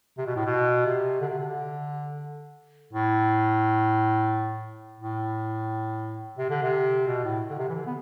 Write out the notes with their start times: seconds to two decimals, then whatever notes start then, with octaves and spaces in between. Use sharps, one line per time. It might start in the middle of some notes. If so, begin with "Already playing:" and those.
0.18 C3
0.26 B2
0.36 A2
0.46 B2
0.86 C3
1.21 D3
1.30 C3
1.38 D3
2.93 A2
5.00 A2
6.38 C3
6.50 D3
6.63 C3
7.07 B2
7.23 A2
7.50 D3
7.58 C3
7.69 E3
7.75 D3
7.87 B3